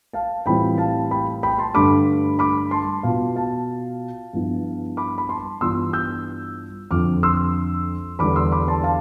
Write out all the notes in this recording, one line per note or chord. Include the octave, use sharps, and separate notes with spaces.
F5 A5
A2 E3 G3 C4 F4 G5 B5
F5 A5
G5 B5
G5 B5
A5 C6
G2 D3 A3 D4 B5 D6
B5 D6
A5 C6
B2 B3 F4 F5 A5
F5 A5
G2 F3 B3 E4
B5 D6
B5
A5 C6
G2 E3 B3 D4 F4 C6 E6
E6 G6
F2 D3 F3 C4 D6 F6
C6 E6
E2 D3 G3 D4 B5 D6
C6 E6
B5 D6
A5 C6
F5 A5